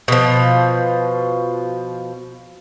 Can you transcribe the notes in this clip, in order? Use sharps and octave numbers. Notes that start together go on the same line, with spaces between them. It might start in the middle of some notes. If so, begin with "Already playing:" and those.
B2 F3